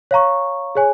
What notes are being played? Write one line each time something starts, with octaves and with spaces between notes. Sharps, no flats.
C#5 F5 A#5 C#6
G#4 C#5 G#5